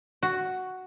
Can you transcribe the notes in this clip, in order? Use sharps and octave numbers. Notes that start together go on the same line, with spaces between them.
F#4